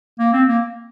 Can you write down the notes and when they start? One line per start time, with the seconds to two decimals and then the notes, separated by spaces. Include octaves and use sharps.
0.19 A#3
0.33 C4
0.48 A#3